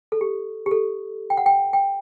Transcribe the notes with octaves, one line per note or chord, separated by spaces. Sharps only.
A4
G4
G4
A4
G5
F#5
G5
G5